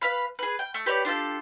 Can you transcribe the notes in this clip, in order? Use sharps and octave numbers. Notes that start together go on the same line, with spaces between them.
B4 F5 B5
G#4 B4
G5
A3
G4 B4 C#5 D5
D4 F4 G4 A4